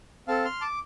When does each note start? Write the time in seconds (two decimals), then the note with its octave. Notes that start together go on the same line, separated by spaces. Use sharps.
0.28 C4 A4 F5 A5
0.45 C6 F6
0.61 A5 D6